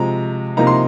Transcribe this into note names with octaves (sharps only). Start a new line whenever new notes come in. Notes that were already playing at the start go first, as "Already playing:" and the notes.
Already playing: C3 F3 G#3 A#5
C3 F3 A#3 D#4 A#5
C6